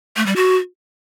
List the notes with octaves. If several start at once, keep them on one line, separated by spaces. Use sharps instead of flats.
A3
G3
F#4